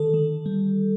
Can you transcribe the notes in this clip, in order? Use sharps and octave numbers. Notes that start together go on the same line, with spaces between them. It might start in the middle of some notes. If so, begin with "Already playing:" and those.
Already playing: D3 D#3 A4
D#3
G3